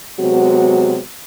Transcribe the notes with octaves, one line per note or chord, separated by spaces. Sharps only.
C3 F#3 G#3 B3 F#4